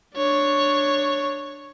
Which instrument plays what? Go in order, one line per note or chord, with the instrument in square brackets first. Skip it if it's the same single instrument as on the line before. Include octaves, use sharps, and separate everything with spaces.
[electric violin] D4 C#5